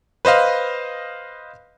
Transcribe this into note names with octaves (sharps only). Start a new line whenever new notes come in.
B4 C5 D#5 F5